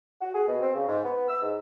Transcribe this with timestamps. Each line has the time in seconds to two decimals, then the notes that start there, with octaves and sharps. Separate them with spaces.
0.21 F#4
0.34 G#4
0.48 B2
0.61 C4
0.74 C#3
0.87 G#2
1.04 B3
1.29 E6
1.42 G#2